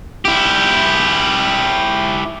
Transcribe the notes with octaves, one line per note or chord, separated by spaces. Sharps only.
E4 G4